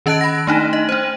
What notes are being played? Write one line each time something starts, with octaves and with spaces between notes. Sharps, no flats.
D#3 C#4 D#5 A5 F#6 D7
B5 A#6
A3 D4 D#4
D#5
D4 C5